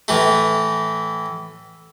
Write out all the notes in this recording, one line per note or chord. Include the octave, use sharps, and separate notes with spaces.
A2 E3 A3